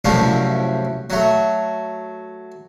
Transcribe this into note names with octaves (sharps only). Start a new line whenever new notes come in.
C2 F#2 A2 C3 F3 A3
F#3 A3